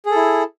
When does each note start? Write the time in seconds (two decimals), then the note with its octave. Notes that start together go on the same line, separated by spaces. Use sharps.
0.06 G#4
0.11 A4
0.15 E4